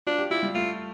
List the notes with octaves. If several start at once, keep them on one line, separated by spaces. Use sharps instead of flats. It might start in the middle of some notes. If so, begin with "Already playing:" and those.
D4 F4
G4
E4 F4
G3
A3 F4